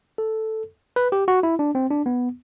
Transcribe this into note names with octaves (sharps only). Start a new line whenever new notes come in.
A4
B4
G4
F#4
E4
D4
C4
D4
B3